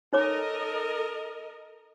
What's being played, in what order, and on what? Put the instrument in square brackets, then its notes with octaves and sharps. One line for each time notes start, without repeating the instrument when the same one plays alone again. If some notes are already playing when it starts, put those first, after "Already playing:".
[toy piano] D#4 C#5 D6 [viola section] A4 A#4 D#5